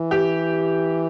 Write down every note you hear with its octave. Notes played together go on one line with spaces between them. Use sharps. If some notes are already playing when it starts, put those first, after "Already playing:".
Already playing: E3
G4